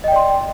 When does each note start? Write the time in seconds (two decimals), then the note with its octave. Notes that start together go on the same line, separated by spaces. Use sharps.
0.04 D#5
0.08 G5
0.12 D5
0.16 C6